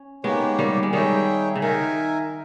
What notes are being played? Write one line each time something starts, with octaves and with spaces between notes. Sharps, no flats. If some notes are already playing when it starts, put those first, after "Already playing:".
Already playing: C#4
G#3 A#3 B3 D#4 G4 C#5
D#3 G3
G#3
D#3 G3 D#4 G#4 C#5 E5 G5
C#3
D#3 D#4 A#4 E5 G#5